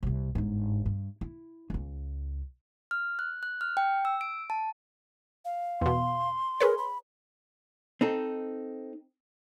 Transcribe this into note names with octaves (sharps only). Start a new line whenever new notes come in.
C2 C3
G1 G#2
G2
E4
C#2 F4
F6
F#6
F#6
F6
G5
E6
D7
A5
F5
E2 B2 C6
G#4 A#4 B4 C#5
B5
C4 D#4 A4